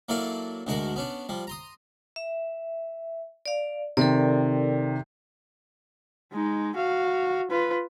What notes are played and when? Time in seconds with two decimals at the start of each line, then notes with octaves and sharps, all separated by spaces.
0.09 F#3 A#3 E4 A4 D5 F5
0.67 D2 G#2 D3 F#4 A#4
0.96 B3 C#4 D4
1.29 F3 G3
1.47 A#5 C6 D#6
2.16 E5
3.46 D5 F5
3.97 C3 D#3 A4 A#4 D5
6.32 G#3 D#4
6.76 F#4 F5
7.50 F4 B4